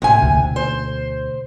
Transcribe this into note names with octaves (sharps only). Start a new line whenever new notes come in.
A2 C3 A#3 G#5
D2 B2
C5